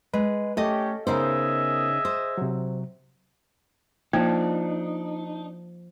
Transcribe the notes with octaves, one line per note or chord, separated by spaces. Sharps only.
G#3 B4
A3 C#4 G4 A4 D#5
C#3 B3 D#4 G#4 A#4 C5 D#5 E5
C5
C3 F#3
F3 A#3 D4 D#4